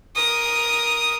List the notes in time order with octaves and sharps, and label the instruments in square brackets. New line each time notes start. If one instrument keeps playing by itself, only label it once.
[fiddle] A#4 D#6